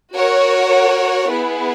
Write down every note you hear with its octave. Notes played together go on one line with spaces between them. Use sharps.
F#4 A#4 C#5 F#5
B3 E4 G#4 B4